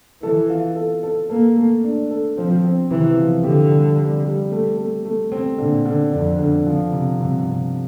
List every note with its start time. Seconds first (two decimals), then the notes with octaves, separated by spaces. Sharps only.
0.22 E3 A4
0.50 F4
0.76 A4
1.03 A4
1.29 A#3 A4
1.56 A3
1.84 D4
2.11 A4
2.37 F3 C4
2.64 C4
2.90 C3 E3
3.18 F3
3.44 D3 G4
3.71 G3
3.99 G3
4.25 G3
4.52 A3
4.78 A3
5.05 A3
5.32 C4
5.58 A#2 D3
5.85 D3
6.12 F2 D4
6.39 D3
6.67 F3
6.92 C3
7.19 G2 C3
7.47 C3